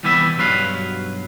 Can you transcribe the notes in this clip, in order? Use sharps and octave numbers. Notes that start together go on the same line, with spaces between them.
C2 E3 G3 B3 E4 E5
B1 G2 F#3 B4 F5